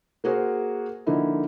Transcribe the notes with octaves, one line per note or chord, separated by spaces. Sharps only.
A#3 F#4 G#4 A#4 C5
D3 F3 A#3 D#4 E4